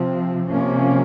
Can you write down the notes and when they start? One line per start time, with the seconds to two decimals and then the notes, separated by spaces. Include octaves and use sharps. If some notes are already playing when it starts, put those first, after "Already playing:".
Already playing: C3 F3 C4
0.48 C3 F3 A#3 C#4